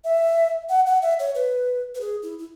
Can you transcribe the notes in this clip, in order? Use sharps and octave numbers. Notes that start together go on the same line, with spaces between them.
E5
F#5
F#5
E5
C#5
B4
B4
G#4
E4
E4